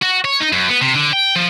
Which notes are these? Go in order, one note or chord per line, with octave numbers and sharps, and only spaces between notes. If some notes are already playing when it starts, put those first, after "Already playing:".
F#4
C#5
D#4
F#2
B3
C3
D3
G5
F3